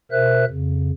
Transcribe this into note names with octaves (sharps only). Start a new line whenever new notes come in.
B2 A#4 C5 E5 F#6
F2 C#3